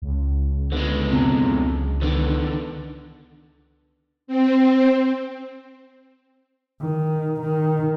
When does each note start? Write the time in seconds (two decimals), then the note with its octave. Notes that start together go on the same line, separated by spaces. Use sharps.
0.02 C#2
0.72 D3 G#3 B3
1.11 F2 B2 F#3
2.02 D3 D#3 B3
4.27 C4
6.81 D#3
7.41 D#3